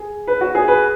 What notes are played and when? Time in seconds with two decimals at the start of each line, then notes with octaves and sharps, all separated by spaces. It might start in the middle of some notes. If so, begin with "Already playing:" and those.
Already playing: G#4
0.27 B4
0.41 F#4
0.55 G#4
0.68 B4